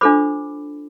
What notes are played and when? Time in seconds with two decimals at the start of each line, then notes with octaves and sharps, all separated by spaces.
0.01 D4 F4 A4 C5 B5 D6